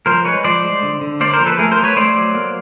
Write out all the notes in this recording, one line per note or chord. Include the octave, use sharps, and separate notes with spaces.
F3 A#4 C5
G#3 B4 C#5
F3 C5 D5
G#3
D3
D3
A#3 C5 D5
A#4 C5
F3
A4 B4
A3 G#4 A#4
A#4 C5
F#3
B4 C#5
A3 C5 D5
F#3
A#3